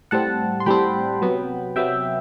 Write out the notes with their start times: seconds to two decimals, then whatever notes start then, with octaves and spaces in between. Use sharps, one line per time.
0.11 A2 G3 C4 F#5 A5
0.60 C6
0.66 A2 G3 C4 G5 B5
1.22 C3 F#3 B3
1.76 C3 F#3 B3 E5 G5